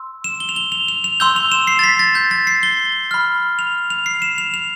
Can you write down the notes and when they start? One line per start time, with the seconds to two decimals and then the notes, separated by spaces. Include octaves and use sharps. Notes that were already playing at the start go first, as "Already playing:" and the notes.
Already playing: C6 E6
0.24 E7
0.40 G7
0.49 F7
0.56 G7
0.72 F7
0.88 F7
1.04 F7
1.20 C6 E6 G6 G7
1.36 F7
1.52 E7
1.67 C7
1.79 A6
1.84 B6
1.99 A6
2.15 G6
2.31 A6
2.47 C7
2.63 G7
3.11 B5 F6
3.59 F7
3.90 F7
4.06 C7
4.22 E7
4.38 F7
4.54 F7